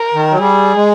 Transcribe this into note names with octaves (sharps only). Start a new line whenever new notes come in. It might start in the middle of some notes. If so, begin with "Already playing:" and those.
Already playing: A#4
D#3
F#3
G3 G#4
G#3